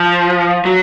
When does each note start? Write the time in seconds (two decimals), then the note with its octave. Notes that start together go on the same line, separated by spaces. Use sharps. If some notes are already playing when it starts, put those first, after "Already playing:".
Already playing: F3
0.65 F#3